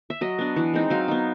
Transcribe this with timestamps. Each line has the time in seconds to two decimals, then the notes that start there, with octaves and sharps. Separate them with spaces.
0.10 E5
0.21 F#3 D#5
0.39 B3 D4
0.56 E3
0.74 G#3 C4 D#4
0.90 F#3 F5
1.08 B3 D#4